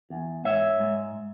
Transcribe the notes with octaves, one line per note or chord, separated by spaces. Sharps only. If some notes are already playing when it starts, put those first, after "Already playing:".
E2
G#2 C#5 E5
G#2